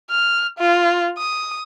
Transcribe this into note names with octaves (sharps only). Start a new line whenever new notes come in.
F6
F4
D#6